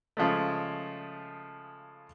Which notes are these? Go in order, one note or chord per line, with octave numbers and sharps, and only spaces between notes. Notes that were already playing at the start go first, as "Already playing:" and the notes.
C#3 F3 G#3 A3